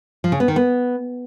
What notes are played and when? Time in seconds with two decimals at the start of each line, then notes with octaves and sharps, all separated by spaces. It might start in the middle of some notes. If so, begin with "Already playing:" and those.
0.24 F3
0.32 C#3
0.40 B3
0.48 D#3
0.56 B3